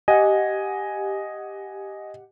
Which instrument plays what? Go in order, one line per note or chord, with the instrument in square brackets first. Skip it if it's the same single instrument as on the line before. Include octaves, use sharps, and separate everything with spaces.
[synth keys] G4 F#5 [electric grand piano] D#5 G#5